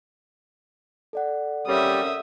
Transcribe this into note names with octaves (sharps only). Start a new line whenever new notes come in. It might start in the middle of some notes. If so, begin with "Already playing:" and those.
A4 D5 F#5
C3 G3 A#3 C#4 E5 D#6